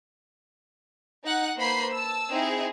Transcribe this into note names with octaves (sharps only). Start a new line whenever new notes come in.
D#4 F#5 F#6
A#3 B4 C5 B5 C7
A5 E6
C4 D#4 E4 G#4